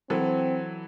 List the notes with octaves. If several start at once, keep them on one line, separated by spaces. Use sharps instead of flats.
E3 F#3 C4 A4